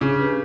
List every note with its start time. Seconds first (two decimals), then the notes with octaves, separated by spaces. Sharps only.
0.01 C#3 D4
0.18 G4 B4